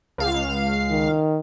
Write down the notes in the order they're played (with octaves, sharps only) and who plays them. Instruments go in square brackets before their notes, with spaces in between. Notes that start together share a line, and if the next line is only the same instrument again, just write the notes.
[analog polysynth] C#2 F5
[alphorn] D#3